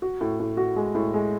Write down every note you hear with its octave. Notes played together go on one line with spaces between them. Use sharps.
F#4
A2
A2
F#4
G#3
A2
G#3